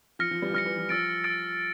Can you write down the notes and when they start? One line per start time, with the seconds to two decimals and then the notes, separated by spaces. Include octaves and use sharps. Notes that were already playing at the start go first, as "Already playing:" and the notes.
0.19 F3 F6 A#6 C#7
0.31 F3
0.42 E3 G3
0.50 F3
0.54 E3 G3 F6 A#6 C#7
0.66 E3
0.78 F3
0.89 F3 E6 A6 D7
1.24 E6 A6 D7